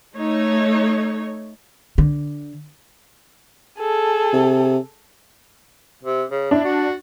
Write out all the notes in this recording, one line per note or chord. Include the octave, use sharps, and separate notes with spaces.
A3 D#4 C#5
D3
G#4 A4
C3
C3
C#3
D4 E4
F#4